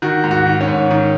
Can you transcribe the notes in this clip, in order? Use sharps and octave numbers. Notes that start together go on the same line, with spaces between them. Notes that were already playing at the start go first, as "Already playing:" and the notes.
D#3 F#4
G#2
F#4
D#3
C#4
G#2
D#3